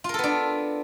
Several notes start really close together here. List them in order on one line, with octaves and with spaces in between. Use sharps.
F4 A#4 A4 B3 D4